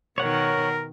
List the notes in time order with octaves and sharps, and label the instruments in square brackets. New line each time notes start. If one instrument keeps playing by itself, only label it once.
[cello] B2 D#3 [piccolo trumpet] A#4 [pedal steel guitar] C#5 F#5